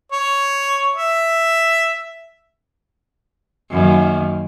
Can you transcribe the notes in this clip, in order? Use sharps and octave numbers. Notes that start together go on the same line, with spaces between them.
C#5
E5
F#2 D#3 A#3